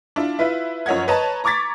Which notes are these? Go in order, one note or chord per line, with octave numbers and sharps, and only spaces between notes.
D4 E4 F4
E4 F4 B4 E5
F#2 F3 C#5 D#5 F#5 G#6
B4 C#5 D#5 A5 A#5
A#5 C#6 D6 G#6 A6 B6